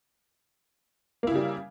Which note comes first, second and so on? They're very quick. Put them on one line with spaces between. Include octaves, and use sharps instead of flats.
A#3 E4 C#3 G3